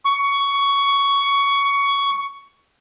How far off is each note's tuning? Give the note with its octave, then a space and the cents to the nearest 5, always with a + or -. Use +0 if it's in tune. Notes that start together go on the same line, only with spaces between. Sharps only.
C#6 +15